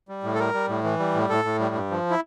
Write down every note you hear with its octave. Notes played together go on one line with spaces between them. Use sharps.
G3
A2
A4
G3 A#4
G3
A2
E3
G3
A2
A2 A4
A2
G3
G2
F3
E4